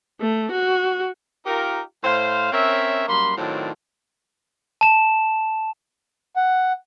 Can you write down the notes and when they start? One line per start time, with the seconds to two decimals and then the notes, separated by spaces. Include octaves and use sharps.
0.21 A3
0.51 F#4
1.46 D#4 F4 G4 A#4
2.04 A2 C5 F5
2.53 C4 C#4 A#4 C#5 E5
3.08 F#2 G3 A#3 B5 C6
3.37 A2 D#3 F#3 C4 D4 F4
4.81 A5 E7
6.36 F#5